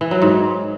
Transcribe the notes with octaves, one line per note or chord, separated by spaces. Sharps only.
E3
F#3
G#2